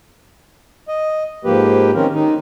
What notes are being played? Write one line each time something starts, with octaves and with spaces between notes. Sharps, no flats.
D#5
G#2 F3 A#3 G4 B4
D#3 C4 C#4 A#4
D#3 D#4